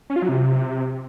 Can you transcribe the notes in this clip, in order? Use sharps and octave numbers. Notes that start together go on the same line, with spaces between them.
C#4
F4
F#3
C3